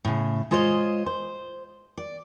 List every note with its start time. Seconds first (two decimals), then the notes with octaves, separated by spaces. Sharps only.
0.05 A2 C#3
0.51 G#3 F4 C5 C#5 D#5
1.06 C5
1.97 D5